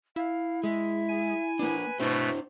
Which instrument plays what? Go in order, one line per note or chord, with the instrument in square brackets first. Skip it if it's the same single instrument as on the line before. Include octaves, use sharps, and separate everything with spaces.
[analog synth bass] E4 [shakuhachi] F5
[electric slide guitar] G#3 [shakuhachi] E5
[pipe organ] G#5
[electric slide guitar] A#3 D4 [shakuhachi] B4
[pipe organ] B2 A3 [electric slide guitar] D4 E4 C5